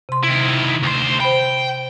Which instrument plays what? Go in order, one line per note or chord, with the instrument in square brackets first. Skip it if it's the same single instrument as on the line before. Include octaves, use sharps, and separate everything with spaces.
[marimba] C3 C6
[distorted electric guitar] D#3 E4
D2 C5
[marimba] C5 B5 [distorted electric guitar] G5